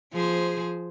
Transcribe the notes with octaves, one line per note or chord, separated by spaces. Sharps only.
F3 G#4 C5